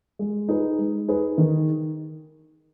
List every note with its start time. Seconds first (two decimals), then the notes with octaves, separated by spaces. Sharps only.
0.19 G#3
0.49 D#4 G#4 B4
0.78 G#3
1.08 D#4 G#4 B4
1.38 D#3